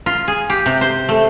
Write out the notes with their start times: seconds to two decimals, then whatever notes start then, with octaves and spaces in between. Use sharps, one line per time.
0.06 F4
0.28 G#4
0.50 G4
0.66 C3
0.81 C5
1.09 A3